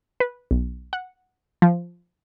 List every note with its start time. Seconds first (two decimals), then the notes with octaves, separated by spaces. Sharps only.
0.20 B4
0.51 B1
0.93 F#5
1.62 F3